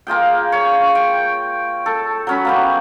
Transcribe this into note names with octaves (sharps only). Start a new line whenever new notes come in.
A#3 F4 G#4 G5
C#5
G5
A4
F#3 C#4 B5
A#3 B3 G4